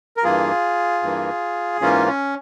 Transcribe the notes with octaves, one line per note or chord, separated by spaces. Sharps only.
A#4
G2 E3 A#3 F4 G#4
G2 E3 A#3
G#2 E3 A#3 C#4 F4
C#4